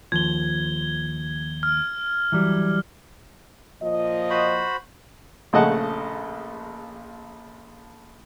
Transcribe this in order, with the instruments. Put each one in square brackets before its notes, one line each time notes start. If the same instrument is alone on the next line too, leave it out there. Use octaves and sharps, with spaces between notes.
[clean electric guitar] D#2 F3 [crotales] G#6 G7
[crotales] F6
[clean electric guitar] E3 F#3 G3
[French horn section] A#2 F3 D#5
[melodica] F#4 C5 B5
[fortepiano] A#1 C#3 A3 D#5 F#5 A5